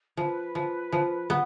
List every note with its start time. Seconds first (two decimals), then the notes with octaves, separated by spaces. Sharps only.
0.17 F3 B4
0.55 F3
0.92 F3
1.30 B3